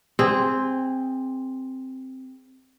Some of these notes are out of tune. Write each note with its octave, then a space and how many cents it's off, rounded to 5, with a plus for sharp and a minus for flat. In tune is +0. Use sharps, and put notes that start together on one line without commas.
C4 +0 G#4 -20